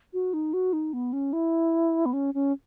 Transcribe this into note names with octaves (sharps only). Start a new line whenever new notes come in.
F#4
D#4
F#4
D#4
B3
C#4
E4
B3
C#4
C#4